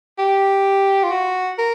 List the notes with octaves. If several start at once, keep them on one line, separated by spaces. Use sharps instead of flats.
G4
F4
F#4
A#4